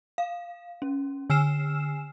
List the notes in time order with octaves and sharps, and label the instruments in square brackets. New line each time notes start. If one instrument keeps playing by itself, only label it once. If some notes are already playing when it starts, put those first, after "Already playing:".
[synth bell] F5
C#4
D3 G#5 E6 F6 C7 E7